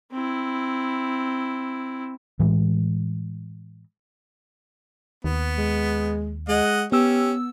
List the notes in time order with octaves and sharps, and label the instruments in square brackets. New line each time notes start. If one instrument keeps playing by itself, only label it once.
[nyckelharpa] C4 E4
[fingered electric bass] A2 E3 G#3
[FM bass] D#2 [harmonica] B3
[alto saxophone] G#3
[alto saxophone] G#3 [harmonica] D#5 F#5
[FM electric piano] B3 E6 [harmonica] C#4 [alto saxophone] G4